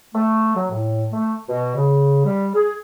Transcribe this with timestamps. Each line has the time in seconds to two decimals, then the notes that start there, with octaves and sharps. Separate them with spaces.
0.14 A3
0.55 F#3
0.70 A2
1.12 A3
1.47 B2
1.75 C#3
2.25 G3
2.54 G#4